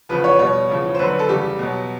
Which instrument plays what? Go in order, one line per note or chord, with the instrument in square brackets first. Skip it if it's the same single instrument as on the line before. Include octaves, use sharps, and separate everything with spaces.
[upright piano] E2 C#3 F3 B4
C#5
B2 G3 C#5
E2 C#3 F3
C5
F#2 D3 F#3 B4
A4
E2 C#3 E3 G3 G4
B2 F#3